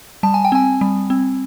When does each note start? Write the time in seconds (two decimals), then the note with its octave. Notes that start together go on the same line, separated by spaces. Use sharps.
0.23 G3 A5
0.34 G#5
0.45 G5
0.52 C4 G#5
0.81 G3
1.10 C4